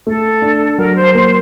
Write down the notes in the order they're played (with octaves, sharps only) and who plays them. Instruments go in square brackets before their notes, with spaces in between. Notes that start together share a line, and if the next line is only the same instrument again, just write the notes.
[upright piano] A3 [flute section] A4
[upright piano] D4
[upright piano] F#3 [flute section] A#4
[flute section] C5
[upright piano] A#3 [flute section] C5